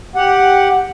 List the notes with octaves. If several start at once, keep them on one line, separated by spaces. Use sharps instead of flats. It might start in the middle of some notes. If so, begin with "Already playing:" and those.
G4 F#5